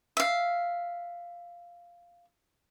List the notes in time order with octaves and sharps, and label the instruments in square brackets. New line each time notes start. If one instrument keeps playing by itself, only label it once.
[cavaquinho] E5 F5